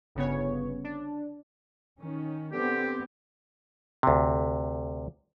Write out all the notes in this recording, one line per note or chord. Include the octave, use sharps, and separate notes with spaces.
G1 C#3 B3 C#5
D4
D#3 C#4
D3 B3 C4 G4
D2 C3